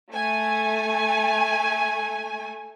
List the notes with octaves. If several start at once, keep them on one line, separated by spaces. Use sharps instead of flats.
A3 G#5